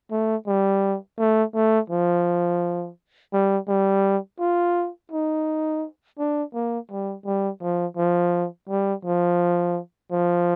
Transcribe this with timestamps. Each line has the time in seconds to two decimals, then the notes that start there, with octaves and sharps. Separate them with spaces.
0.11 A3
0.47 G3
1.19 A3
1.55 A3
1.90 F3
3.33 G3
3.68 G3
4.40 F4
5.12 D#4
6.18 D4
6.54 A#3
6.90 G3
7.25 G3
7.61 F3
7.97 F3
8.69 G3
9.05 F3
10.11 F3